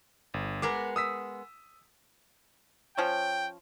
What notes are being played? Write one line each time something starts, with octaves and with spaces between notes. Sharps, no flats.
G1
G#3 B3 A#4 D6
D#6 E6 B6
F3 C#4 C#5 G5